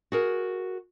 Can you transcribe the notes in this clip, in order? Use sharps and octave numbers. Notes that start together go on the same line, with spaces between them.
F#4 G#4 A#4